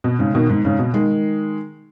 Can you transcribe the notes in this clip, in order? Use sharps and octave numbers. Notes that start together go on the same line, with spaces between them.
B2
G#2 C#3
B2 D#3
G#2
G#2 C#3
B2
D#3 G#3